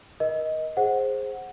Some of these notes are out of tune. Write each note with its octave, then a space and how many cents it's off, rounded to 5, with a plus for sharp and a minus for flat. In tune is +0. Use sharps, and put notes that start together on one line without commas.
A#4 +40 D#5 +15
G#4 +0 C5 +15 F#5 -5